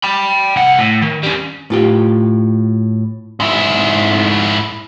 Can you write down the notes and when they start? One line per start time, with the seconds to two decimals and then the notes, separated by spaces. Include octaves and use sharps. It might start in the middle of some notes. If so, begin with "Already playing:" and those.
0.04 G5 B5
0.56 C2 F#5
0.79 A2
1.02 D#3
1.23 G3 C#4
1.70 A2 F4 G4
3.40 G#2 E4